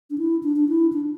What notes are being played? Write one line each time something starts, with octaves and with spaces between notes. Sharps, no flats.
D4
E4
D4
D4
E4
D4